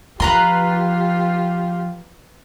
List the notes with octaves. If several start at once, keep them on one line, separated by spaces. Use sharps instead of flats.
F3 F4 G4 B4 A#5 C6